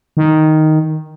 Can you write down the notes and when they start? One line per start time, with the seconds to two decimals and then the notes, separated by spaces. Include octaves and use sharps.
0.17 D#3